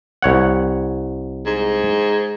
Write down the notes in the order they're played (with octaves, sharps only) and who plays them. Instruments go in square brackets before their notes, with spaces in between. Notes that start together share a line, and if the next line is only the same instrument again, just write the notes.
[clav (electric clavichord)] C2 C#5 F#5
[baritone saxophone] G#2